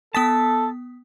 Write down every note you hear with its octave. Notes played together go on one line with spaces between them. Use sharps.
B3 A4 A5 D#6 B6